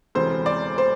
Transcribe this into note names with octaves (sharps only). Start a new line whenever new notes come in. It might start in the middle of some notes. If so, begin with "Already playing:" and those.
E1 D2 C3 E3 C5
D5
C5